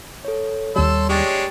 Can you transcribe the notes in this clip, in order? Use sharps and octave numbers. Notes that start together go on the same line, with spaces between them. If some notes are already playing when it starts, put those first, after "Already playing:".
A4 C#5
D#2 G3 A4 C#5 C6 E6
G#3 D4 G4 C#5 G5 A6